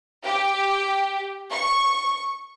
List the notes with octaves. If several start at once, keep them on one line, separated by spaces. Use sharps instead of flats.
G4
C#6